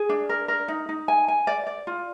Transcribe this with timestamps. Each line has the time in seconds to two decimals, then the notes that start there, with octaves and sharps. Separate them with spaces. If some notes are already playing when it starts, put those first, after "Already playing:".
Already playing: G#4
0.09 D4
0.29 A#4
0.48 A#4
0.68 D#4
0.89 D#4
1.08 G#5
1.28 G#5
1.47 D5
1.67 D5
1.87 F4